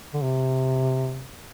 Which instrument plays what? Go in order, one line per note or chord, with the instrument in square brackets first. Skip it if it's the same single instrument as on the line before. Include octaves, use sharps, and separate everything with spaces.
[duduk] D3
C3